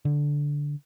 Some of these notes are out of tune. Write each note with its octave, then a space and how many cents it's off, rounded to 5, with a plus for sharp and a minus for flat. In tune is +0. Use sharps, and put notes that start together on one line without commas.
D3 -10